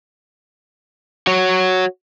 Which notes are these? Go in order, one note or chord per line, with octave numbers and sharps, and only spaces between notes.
F#4 C#5